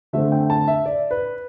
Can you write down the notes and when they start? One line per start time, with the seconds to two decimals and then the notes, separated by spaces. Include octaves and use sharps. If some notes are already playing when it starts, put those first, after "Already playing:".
0.13 D3 A3 C4 E5
0.32 G5
0.50 A5
0.68 E5
0.86 D5
1.11 B4